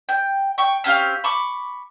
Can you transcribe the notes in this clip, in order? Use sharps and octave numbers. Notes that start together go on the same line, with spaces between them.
G5
G5 C#6
C4 C#4 G4 F5
B5 C#6 D6